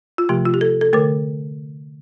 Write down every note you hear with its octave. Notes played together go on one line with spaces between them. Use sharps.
F4
C3 F3 A3 G4
F4
G4
A4
A4
D3 A3 A#4